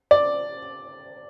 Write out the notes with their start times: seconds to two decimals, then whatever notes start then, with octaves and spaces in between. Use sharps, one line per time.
0.11 D5